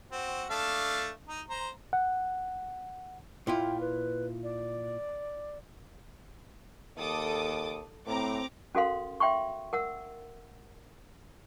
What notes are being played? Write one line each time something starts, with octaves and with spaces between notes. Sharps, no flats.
C4 F#4
A3 D4 F5
D#4
C5 A#5
F#5
A#2 E4 F4 G5
B4
D5
D#2 A4 D6 D#6
A2 C4 A#5 D6
C#4 F#4 A4 A#4 F5 C6
E5 G5 C6 C#6
A#4 F#5 E6